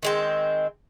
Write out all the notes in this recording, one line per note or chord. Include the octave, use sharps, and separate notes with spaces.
D#3 G#3 C4